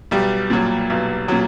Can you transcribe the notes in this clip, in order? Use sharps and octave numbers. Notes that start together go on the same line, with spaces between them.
B1 G3
A#2 F#3
B1
A#2 F#3